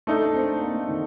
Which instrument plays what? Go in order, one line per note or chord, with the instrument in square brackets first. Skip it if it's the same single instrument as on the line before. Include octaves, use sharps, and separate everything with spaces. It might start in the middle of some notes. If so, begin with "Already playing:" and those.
[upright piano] A3 D#4 A4 [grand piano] D4
[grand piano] D4
C4
A#3
D#3